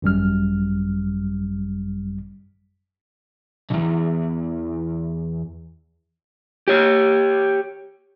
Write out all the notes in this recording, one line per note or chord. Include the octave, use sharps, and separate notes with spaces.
G#1 F#2 G3 F6
B1 E2
G4 C#5